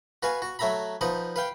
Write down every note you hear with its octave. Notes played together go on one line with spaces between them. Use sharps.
F#4 B4 F5 G#5
F#4
F#3 A3 E5 A#5 B5
F3 D#4 B4 F#5
B4 F5 G5